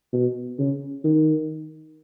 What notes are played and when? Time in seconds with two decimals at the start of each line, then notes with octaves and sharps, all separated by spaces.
0.13 B2
0.59 C#3
1.04 D#3